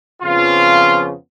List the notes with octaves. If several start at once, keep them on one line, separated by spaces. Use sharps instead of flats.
F2 C#3 F3 B3 F4